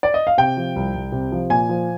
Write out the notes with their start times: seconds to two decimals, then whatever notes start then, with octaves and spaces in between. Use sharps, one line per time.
0.03 D5
0.14 D#5
0.27 F5
0.37 C3 G5
0.57 F3
0.76 C2
0.94 C2
1.12 C3
1.32 F3
1.50 A#2 G#5
1.69 F3